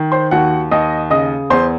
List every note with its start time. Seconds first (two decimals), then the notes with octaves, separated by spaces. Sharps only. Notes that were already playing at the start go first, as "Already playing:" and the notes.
Already playing: D#3
0.12 C5 C6
0.31 D#2 F#4 F#5
0.71 D#2 D#5 D#6
1.10 C#3 D#5 D#6
1.50 E2 C5 C6